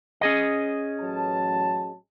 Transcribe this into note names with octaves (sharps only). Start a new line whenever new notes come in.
C#4 G#4 D#5
A1 F#3 A5